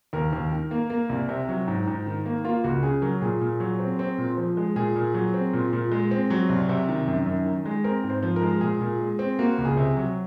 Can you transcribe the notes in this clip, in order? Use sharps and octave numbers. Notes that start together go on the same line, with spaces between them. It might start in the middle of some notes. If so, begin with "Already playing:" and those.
D#2 A#4
D#2
D#3
A#3
A#3
C2
C3
F#3
G#2
G#2
D#3
A#3
A#3 F4
C#2 F#4
C#3 G#4
F#3 A#4
A#2 G#4
A#2
F#3
C4
C4
A#2
F3
G#3
A#2 G#4
A#2
F#3
C4
A#2
A#2
G#3
C4
F#3
C2
C3
D#3
F#2
F#2
D#3
G#3
C4 A#4
G#2
C5
F3
A#4
G#3
A#2 G#4
A#2
G#3
C4
A#3 F#4
C#2
G#4
C3
F#3